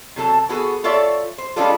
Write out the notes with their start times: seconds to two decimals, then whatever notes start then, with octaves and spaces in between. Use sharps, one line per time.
0.16 C3 F#3 A4 A5
0.49 B3 F#4 G#4 A4
0.84 F4 A4 C#5 D5 E5
1.38 C5
1.56 G3 G#3 C#4 D4 F4 A4